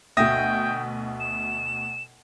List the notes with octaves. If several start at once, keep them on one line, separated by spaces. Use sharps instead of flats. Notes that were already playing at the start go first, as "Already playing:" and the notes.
D2 B2 E5 G5 D#6 A#6
E7